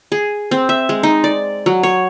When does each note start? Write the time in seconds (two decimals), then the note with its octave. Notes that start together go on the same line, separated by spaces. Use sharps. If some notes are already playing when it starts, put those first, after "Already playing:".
0.12 G#4
0.51 C4
0.69 E5
0.89 G#3
1.03 D#4
1.24 D5
1.66 F#3
1.83 C#5